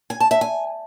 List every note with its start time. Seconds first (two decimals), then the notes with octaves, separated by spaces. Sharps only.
0.10 G#5
0.20 A5
0.31 E5
0.41 G#5